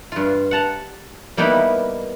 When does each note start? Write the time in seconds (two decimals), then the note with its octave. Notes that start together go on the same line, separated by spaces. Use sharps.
0.12 G2 F4
0.51 F#5 A5 A#5
1.37 G3 A#3 B3 D#4 E4 B4